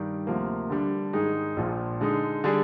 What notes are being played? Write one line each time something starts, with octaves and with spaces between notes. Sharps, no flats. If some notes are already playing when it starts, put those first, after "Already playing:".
Already playing: G2 D#3 G3
D2 C3 F3 A#3
D3 G3 D4
G#2 D#3 G#3 D#4 G#4
A#1 A#2 F3
D3 G#3 D#4
D3 G3 D4 G#4